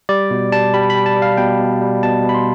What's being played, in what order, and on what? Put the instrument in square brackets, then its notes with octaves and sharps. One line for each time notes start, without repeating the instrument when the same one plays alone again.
[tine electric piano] G3 D5
B2
G3 A5
G3 B5
G3 B5
A5
G3
F5
B2 G5
B2
G3
B2 A5
B2
B5
C6